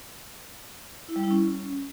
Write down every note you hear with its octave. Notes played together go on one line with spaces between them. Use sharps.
E4
G3
E4
C#4